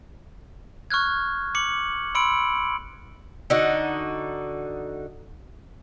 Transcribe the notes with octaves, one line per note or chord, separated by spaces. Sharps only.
C#6 F6 F#6 G#6
D6 C#7 F#7
B5 C6 E6 C#7 D7 F#7
D3 D#4 F#4